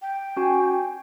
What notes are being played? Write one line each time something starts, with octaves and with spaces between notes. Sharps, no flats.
G5
C#4 F#4 G#5